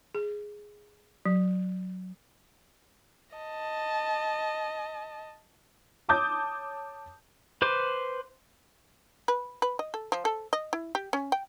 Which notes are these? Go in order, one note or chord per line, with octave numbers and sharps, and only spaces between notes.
G#4
F#3
D#5 A5
C#5 A5 D6 D#6 G6
B4 C5 D6
B4
B4
D#5
A4
F3
A4
D#5
E4
G4
C#4
G5